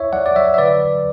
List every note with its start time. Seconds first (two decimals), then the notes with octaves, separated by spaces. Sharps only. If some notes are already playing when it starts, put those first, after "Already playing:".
Already playing: E4 C#5 E5
0.13 F#3 D5 F#5
0.26 D5
0.36 F#3 C#5 E5
0.54 E5
0.58 D3 B4 D5
0.80 F#3